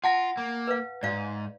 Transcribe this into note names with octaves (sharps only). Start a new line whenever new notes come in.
F4 F#5 A5 A#6
A#3
B4 F5
G#2 D5 F5